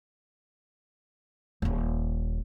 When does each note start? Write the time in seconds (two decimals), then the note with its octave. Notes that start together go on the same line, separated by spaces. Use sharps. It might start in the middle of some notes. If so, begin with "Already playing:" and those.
1.62 D#1 D#2